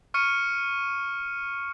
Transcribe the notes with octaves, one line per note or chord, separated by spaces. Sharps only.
C#6 F6 C#7 D#7